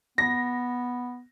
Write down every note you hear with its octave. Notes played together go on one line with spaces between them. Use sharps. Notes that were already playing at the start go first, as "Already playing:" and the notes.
B3 A#6